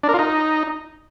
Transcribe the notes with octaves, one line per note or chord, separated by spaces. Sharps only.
D4
A#4
F4
D#4